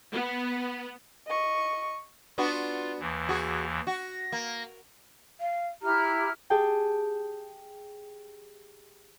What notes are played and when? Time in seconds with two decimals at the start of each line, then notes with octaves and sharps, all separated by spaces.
0.13 B3
1.27 D#5 C#6
2.38 B3 D4 F4 F#4
3.00 D#2 E3
3.29 F#4 G#4
3.87 F#4 A#6
4.32 A#3
5.41 F5
5.82 E4 G4 A#5 F6
6.50 G4 G#4 G5 A5